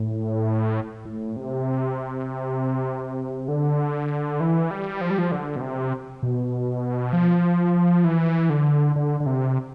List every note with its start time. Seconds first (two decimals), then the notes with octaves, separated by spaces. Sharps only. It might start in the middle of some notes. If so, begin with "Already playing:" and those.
Already playing: A2
1.05 A2
1.36 C3
3.48 D3
4.40 E3
4.71 G3
5.01 F3
5.11 G3
5.18 F3
5.32 D3
5.56 B2
5.61 C3
6.23 B2
7.13 F3
8.04 E3
8.50 D3
8.96 D3
9.20 D3
9.26 C3